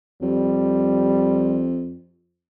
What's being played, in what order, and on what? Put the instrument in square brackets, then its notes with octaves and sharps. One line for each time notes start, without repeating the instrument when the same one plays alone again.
[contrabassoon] F2 [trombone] G3